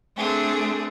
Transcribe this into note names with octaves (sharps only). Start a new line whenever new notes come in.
A3 C4 D4 G#4